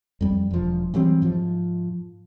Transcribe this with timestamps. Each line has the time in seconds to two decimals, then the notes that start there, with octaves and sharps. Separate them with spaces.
0.21 F2 G3
0.51 E1 F3
0.94 E3 F#3 G3 C4
1.22 G#2 F3